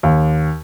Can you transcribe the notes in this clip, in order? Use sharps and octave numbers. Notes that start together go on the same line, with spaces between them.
D#2